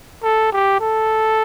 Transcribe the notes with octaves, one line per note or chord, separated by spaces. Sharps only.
A4
G4
A4